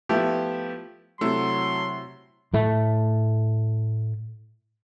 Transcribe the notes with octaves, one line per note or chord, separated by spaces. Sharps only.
F3 A3 B3 E4 G4
C3 F#3 A3 E4 C6 E6
A2 A3